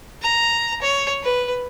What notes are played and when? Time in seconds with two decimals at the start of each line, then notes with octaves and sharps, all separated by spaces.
0.22 A#5
0.82 C#5
1.23 B4